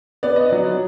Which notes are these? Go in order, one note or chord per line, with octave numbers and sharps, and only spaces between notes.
B3 D5
D#5
F#3 D5